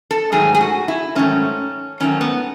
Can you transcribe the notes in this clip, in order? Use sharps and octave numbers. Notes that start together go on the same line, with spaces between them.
A4
G#2 D#3 F#3 A3 G#4
G#4
F#4
E4
G#2 D#3 F#3 A3 C#4
G#2 D#3 F#3 A3 C#4
B3